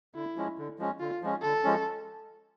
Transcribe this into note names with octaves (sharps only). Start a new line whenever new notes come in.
D3 E4
F3 G#3 C#4
D3
F3 G#3 C#4
D3 F4
F3 G#3 C#4
D3 A4
F3 G#3 C#4